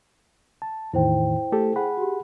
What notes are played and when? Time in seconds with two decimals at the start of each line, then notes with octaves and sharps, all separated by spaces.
0.62 A5
0.93 E2 A2 D#3 E4 C5 G5
1.52 A3 G4 A4
1.76 G#4 F#5 B5
1.97 F#4 G4